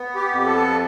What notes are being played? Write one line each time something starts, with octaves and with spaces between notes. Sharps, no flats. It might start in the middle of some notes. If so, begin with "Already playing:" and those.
Already playing: B3
G4
F2
A4